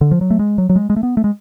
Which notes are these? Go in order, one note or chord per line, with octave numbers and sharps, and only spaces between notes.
D3
F3
F#3
A3
G#3
F#3
F#3
G#3
G#3
A3
B3
A3
G#3